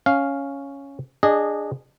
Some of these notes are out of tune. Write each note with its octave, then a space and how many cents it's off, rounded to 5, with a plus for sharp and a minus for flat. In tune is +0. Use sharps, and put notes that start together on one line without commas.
C#4 +0 F5 +0
D4 +0 G#4 -10 D#5 -15